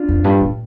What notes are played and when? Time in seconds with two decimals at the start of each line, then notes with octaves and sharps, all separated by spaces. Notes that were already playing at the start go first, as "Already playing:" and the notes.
Already playing: D4 F4
0.08 F2
0.24 G2
0.41 A2